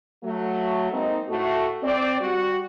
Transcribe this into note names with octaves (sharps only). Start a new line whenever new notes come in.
F#3 A3
G#3 A#3 C4 D#4
A2 A3 F#4
C4 D5
G3 F#4